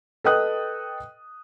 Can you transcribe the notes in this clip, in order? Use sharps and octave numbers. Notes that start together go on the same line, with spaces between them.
A4 B4 D#5 G5 D#6 F#6